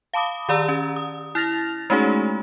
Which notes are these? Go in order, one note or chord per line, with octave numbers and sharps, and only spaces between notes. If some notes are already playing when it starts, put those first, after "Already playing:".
F5 A5 B5 D6 D#6
D#3 G4 D5 A#5 E6
C#4
D#6
E4 F6 A6 A#6 F7
G#3 A3 C#4 D#4 F#4 G#4